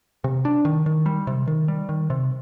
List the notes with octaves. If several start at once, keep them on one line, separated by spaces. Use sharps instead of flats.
C3
D4
D#3
D#3
G3
C3
D#3
G3
D#3
C3